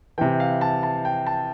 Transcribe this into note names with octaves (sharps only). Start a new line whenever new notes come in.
C3 E3 G5
F5
A5
A5
G5
A5